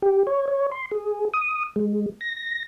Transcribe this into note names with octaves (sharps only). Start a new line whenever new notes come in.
G4
C#5
C#5
C6
G#4
D#6
G#3
A#6